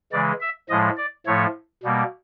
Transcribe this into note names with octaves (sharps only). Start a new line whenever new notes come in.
C#3 E3 G#3 D5
E5
A2 F3 G#3 D#5
D5
A2 F3 A3 C#5
B2 G3 A#3